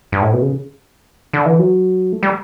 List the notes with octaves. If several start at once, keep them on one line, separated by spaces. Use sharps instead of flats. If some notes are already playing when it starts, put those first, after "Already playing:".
G2
A2
B2
C#3
D3
E3
F#3
A3
G3